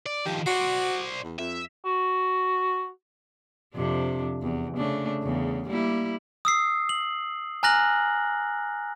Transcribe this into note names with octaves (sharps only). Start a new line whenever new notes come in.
D5
D#3 F3 G4
F#4 C5 D5
E2
F2 E5
F#4
F2 C3 D4
E2
C#3 A3 D4
E2 C#3
G3 A#3 E4
D#6 E6 C7
F#7
G#5 A#5 F6 F#6 A#6 F#7